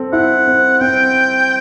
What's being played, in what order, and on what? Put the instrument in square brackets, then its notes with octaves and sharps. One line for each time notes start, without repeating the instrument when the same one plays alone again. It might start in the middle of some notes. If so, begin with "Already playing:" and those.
Already playing: [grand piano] C4 A4
[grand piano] E4 [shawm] F#5
[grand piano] C4
[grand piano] C4 [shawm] G5